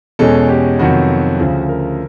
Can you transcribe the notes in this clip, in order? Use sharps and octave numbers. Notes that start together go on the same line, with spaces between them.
E2 B2 G#3 C#4 A4
G4
F2 C3 D#3 F#3 B3 F#4
D2 C#3 F3
A#4